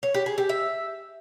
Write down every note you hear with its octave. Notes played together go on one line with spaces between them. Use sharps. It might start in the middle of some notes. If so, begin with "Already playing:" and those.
C#5
G4
G#4
G4
E5